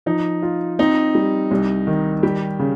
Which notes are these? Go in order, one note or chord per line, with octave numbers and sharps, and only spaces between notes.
F3 D#4
F4
C4 D#4
G3
C2
D#3
G3 G4
C#3